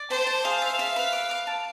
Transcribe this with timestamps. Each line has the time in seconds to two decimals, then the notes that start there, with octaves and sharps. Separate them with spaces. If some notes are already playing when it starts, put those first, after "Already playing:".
Already playing: D5
0.10 C5 A5
0.27 A5
0.44 G#4 F5
0.62 E5
0.79 E5
0.96 B4
1.13 D6
1.31 D6
1.47 A5